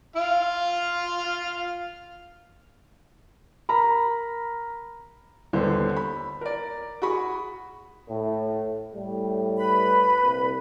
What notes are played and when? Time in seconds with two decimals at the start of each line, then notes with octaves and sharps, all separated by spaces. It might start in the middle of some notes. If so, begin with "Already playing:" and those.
0.16 F4 F5
3.69 A#4 A#5 B5
5.53 D#1 C2 D3 B3 C5
5.96 B5
6.41 A#4 D5
7.02 F#4 G#4 B5 C#6
8.09 A2
8.94 A2 G3
9.58 B4 B5
10.22 C2 A#2